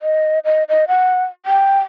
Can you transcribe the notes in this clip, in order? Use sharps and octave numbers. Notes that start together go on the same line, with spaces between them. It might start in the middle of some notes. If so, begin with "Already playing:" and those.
D#5
D#5
D#5
F#5
G5